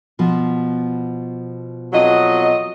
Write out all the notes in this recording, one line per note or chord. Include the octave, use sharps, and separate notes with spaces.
B2 F3
F2 F#3 D#5